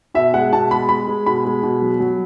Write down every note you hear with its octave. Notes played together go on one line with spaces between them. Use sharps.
B2 E5
G#3 F#5
B2 A5
G#3 B5
G#3 B5
G#3
B2 B5
G#3
B2
F#3
F#3